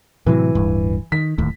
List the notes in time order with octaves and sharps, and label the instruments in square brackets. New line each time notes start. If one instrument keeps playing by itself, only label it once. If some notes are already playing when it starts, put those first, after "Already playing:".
[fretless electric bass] A2 C3 F#3 [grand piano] E3
[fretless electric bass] D1 G2
[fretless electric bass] D#3 [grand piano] B6
[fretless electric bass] D1 D#2 A2